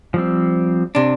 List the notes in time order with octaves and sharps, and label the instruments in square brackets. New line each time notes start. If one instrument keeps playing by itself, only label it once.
[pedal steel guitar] F3 G3 C4
[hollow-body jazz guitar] C3 D4